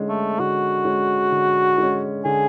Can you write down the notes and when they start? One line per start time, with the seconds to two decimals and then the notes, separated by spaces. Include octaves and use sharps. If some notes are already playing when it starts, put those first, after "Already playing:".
Already playing: D3 G#3 C#4
0.09 A3
0.39 D3 F#4
0.85 G#3 C#4
1.31 D3
1.78 G#3 C#4
2.25 D3 G#4